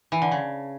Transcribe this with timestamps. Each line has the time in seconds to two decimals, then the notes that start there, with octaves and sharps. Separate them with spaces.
0.12 E3
0.22 D3
0.31 C#3